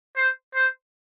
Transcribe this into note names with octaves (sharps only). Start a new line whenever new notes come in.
C5
C5